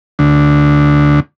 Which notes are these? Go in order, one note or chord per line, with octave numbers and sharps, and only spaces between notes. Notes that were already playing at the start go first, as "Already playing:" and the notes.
D2